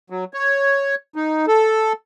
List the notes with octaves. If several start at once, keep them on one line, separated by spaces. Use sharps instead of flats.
F#3
C#5
D#4
A4